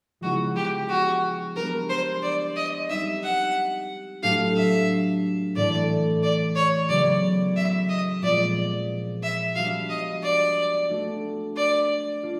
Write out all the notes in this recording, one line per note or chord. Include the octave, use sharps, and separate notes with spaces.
C#3 F3 G#3 B3 E4 F#4
G4
F#4
G3 B3 D4 G4 A#4
C5
D5
D#5
G3 C4 D#4 G4 E5
F#5
A2 F#3 A3 D4 G4 F5
E5
A2 E3 A3 D5
D5
C#5
C#3 F#3 B3 D5
E5
D#5
A#2 F3 G#3 C4 D5
E5
G3 B3 D4 F#4 F5
D#5
D5
A3 D4 F#4
D5
D4 F4